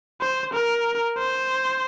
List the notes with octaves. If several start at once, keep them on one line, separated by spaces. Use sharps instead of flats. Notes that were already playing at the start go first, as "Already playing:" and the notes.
C5
A#4
C5